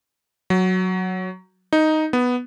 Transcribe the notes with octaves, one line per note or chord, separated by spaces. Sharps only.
F#3
D#4
B3